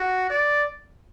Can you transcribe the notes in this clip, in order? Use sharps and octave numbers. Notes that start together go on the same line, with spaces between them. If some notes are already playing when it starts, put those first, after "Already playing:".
Already playing: F#4
D5